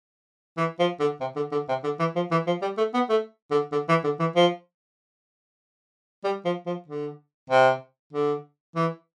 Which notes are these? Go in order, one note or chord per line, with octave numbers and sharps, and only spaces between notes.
E3
F3
D3
C3
D3
D3
C3
D3
E3
F3
E3
F3
G3
A3
B3
A3
D3
D3
E3
D3
E3
F3
G3
F3
F3
D3
C3
D3
E3